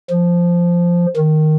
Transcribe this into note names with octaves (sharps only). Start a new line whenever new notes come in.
F3
D#3